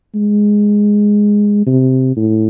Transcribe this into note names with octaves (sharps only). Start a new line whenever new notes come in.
G#3
C3
A2